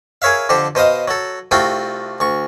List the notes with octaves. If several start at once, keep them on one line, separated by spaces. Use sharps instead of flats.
G#4 A#4 C#5 E5 F5
F2 D3 G4 C5
B2 C5 D#5 F5 D#6
F#3 A4
C2 A3 C4 F4 F#4 G5
D2 C#6